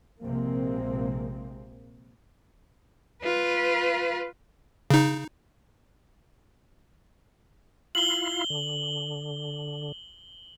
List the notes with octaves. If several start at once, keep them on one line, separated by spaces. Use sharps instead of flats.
A#1 C3 G#3 A#3 C4
F4 B4
C#3 D#4
E4 F4 F5 F#7 G7
D3